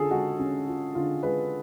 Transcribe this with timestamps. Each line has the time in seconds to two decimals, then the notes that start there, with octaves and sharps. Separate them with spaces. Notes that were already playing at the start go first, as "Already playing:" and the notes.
Already playing: D3 C#4 F4 G#4 A4
0.11 G#3 F#4
0.39 C#4
0.68 F4
0.95 D3 F4
1.23 G#3 B4